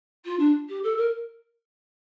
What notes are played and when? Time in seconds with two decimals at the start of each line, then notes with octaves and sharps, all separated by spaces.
0.25 F4
0.39 D4
0.68 G4
0.83 A4
0.97 A#4